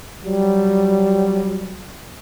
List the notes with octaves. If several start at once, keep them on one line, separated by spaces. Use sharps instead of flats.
F#3 G3